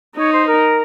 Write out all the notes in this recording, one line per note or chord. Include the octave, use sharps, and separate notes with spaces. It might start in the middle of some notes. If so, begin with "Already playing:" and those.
D#4 C#5
C5
A#4